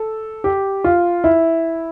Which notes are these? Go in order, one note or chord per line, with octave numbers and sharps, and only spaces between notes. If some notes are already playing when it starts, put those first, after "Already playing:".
Already playing: A4
G4
F4
E4